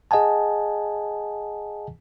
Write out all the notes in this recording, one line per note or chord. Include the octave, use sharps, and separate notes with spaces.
G#4 D#5 F#5 G#5 A5